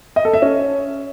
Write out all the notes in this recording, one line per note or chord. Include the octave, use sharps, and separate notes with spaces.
D#5
A4
E5
C#4